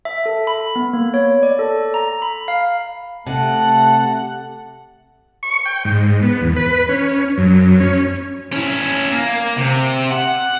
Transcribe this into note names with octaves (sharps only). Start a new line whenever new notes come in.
E5
A4
B5
B3
A#3
C#5
D5
A4
A#5
B5
F5
C3 A3 F#5 A5
C#6
G5
G#2
B3
E2
B4
C#4
F#2
C#4
C#4 E4
A#3
C3
F#5